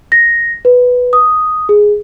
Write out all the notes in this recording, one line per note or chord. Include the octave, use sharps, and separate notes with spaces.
A#6
B4
D#6
G#4